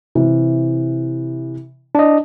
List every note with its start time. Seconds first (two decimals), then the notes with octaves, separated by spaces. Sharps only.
0.15 C3 E3
1.95 D4 D#5